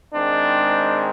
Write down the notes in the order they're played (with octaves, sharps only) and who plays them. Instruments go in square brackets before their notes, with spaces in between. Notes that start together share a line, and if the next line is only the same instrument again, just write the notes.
[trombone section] G#2 D#3 G#3 C4 D4